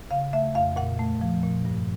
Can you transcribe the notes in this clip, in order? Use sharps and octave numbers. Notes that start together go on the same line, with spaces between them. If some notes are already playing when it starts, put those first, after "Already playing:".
C#3 F5
A3 E5
F2 F5
A#2 F#5
A3
F3
A#2
G2